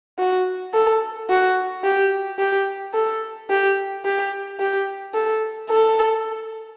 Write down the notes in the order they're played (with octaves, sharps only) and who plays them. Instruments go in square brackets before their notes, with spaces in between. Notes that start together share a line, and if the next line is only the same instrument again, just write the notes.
[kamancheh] F#4
A4
F#4
G4
G4
A4
G4
G4
G4
A4
A4